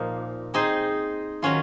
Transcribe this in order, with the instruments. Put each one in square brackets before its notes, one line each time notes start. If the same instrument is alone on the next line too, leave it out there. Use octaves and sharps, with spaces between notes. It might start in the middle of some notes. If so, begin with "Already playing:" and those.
Already playing: [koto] A#2 F3 A#3 D#4
C4 D#4 G#4 C5 D#5
D#3 F#3 C#4 F4